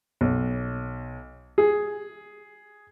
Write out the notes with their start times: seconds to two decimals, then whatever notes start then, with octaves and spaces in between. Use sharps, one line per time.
0.21 B1
1.58 G#4